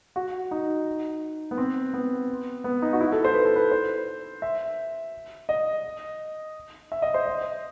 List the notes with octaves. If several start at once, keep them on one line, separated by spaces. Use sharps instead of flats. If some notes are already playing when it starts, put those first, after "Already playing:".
F#4
D#4
B3
C4
B3
B3
D#4
F#4
E4
A4
C5
B4
A4
B4
C5
E5
D#5
E5
D#5
C5
D#5